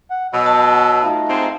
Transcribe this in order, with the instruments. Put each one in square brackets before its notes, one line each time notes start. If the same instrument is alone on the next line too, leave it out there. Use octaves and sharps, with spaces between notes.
[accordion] F#5
[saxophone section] B2 F#3 [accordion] D#5 B5 E6
[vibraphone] A5
[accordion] A3 D#4 F4
[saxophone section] G#2 C4